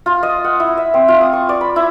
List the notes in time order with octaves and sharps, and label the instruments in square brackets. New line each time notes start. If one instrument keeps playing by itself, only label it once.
[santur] F4
D#5
F#5
E4
E5
C4
F4
D#6
C#6
D5
B5
E4